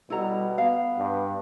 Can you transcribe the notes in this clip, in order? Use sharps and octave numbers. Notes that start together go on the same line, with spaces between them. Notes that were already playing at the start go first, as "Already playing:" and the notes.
B2 G3 E4 A4 A#5
B3 F5
G2